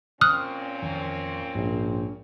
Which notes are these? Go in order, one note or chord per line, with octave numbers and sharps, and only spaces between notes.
A#2 C4 C#4 D#6 F6 F#6
F2 D#3 E3
A#1 G#2